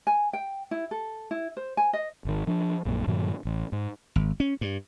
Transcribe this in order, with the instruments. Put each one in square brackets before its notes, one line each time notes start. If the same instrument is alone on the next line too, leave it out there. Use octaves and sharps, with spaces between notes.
[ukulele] G#5
G5
E4
A4
E4
C5
G#5
D#5
[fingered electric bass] G#1 D#3
F3 D4
A#1 F#2 A#2
G2 A#2 D#3 F#3
A1
G#2
[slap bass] G#1
C#4
G2